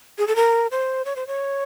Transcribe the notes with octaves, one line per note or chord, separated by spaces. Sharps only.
G#4
A4
A#4
C5
C#5
C5
C#5